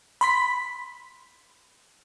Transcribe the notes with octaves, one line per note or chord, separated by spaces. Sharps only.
B5 C6 B6